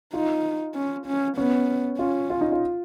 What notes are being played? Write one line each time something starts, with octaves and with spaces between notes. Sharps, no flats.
D#4 F4
C#4
C#4
B3 C#4
C#4 F4
F4
D#4
F4